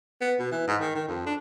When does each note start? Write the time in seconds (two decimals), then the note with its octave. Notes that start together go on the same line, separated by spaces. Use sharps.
0.21 B3
0.39 B2
0.52 E3
0.68 G#2
0.81 D#3
0.95 D#3
1.08 F2
1.26 D4